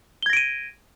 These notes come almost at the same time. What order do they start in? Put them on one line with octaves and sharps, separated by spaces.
G7 G#6 A#6 D7 D#7